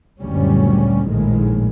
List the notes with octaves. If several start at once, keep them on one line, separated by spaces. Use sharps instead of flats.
F#1 D2 A#2 G3 C#4
A#1 A2 D#3 G#3